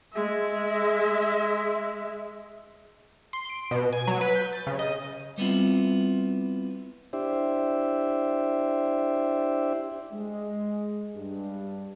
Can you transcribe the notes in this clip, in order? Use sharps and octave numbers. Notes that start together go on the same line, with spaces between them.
G#3 E5
C6
D7
B2
G#5
F#3
B4
G6
A6
C#3
D#5
G3 B3 C4 E4 F4
D4 E4 G4 C5 D5 E5
G#3
G2